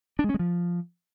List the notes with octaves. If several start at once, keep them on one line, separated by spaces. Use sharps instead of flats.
D4
G#3
C#4
G#3
F3